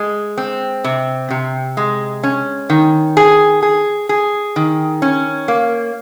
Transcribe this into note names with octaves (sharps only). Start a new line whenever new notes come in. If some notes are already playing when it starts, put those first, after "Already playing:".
Already playing: G#3
C4
C3
C3
G#3
C#4
D#3
G#4
G#4
G#4
D#3
C#4
A#3